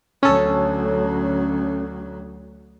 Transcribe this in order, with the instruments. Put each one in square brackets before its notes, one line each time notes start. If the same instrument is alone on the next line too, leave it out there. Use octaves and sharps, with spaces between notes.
[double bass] D2 F#3 [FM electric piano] C#4 A4